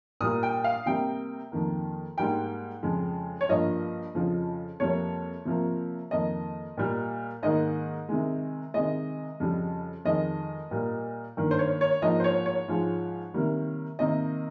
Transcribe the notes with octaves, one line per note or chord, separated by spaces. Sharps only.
A#2 G3 A#3 D#6
G5
F5
C3 G3 A#3 G5
F2 D#3 A#3
G#2 G3 A#3 G5
F2 C#3 G#3
C#5
G2 F3 A#3 D#5
F2 C#3 F3
F2 C3 G3 A#3 C#5
C3 F3 A#3
F2 D#3 A#3 D#5
A#2 G3 A#3
G#2 D#3 A#3 D#5
C3 D#3 G#3
C3 D#3 G#3 D#5
F2 C#3 G3
F2 D#3 G#3 D#5
A#2 G3 A#3
G2 D#3 A#3
C5
C#5
C#5
G#2 F3 A#3 D#5
C5
C#5
C#5
G#2 F3 G#3
C3 D#3 G3 A#3
C3 D#3 A#3 D#5